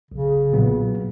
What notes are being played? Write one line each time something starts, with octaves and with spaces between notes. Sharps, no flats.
B1 C#3
A#2 F#3 B3